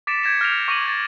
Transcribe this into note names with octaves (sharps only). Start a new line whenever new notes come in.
D6 A6 B6 C#7 D7 E7
G6 G#6 A#6 C#7 E7
F6 G6 A#6 C7 D7 F7
C#6 D6 A#6 D#7 E7 F#7
D6 G#6 A6